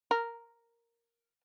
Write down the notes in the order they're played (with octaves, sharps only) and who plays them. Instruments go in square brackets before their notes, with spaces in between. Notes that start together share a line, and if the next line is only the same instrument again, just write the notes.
[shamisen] A#4